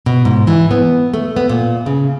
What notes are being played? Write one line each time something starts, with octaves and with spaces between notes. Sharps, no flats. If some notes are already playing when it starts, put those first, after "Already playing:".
B2
G#2
E3
B3
A3
B3
A#2
C#3